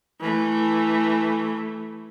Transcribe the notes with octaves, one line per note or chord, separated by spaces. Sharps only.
E3 A3